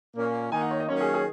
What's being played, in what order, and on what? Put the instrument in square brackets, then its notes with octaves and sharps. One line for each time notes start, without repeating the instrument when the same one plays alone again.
[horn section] A#2 A#3 C#4
[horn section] D#3 A#3 D#4 [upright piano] G#5
[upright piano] F#5
C#5
D#5
[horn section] D#3 F#3 A#3 C#4 [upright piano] C#5
[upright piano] G#4
G#4